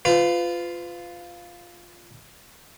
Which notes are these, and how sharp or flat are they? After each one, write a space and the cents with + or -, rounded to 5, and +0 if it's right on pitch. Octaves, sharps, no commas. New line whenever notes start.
F4 +0 B4 +35